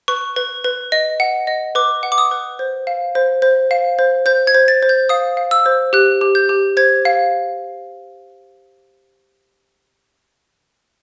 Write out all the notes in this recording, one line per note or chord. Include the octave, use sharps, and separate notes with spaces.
B4 C#6
B4
B4
D#5
F#5
D#5
B4 D6
F#5
D6
D#6
B4
C5
F5
C5
C5
F5
C5
C5 G6
G#6
C5
A6
C5
G6
F5 D#6
F5
E6
C5
G4 F#6
G4
G6
G4
C5 G#6
F5